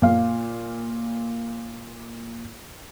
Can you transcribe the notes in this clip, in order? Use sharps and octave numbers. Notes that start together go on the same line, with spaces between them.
A#2 F5